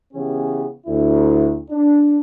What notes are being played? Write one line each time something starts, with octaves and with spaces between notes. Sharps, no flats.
C#3 E3 B3 C#4 G4
D2 E4
D4